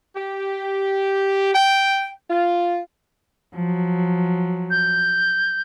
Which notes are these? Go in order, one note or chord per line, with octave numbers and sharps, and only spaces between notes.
G4
G5
F4
F3 F#3
G6